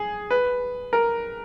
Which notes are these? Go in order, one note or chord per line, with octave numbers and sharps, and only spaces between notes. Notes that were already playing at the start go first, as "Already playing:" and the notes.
Already playing: G#4
B4
A#4